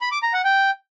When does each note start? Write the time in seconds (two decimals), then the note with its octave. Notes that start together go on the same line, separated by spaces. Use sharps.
0.01 B5
0.12 D6
0.22 A#5
0.33 F#5
0.44 G5